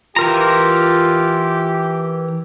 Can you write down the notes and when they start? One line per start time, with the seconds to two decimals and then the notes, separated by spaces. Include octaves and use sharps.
0.16 E3 F4 G4 A#4 A#5